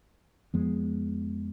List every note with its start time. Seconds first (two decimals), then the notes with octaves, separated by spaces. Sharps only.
0.54 F2 F3 G#3 B3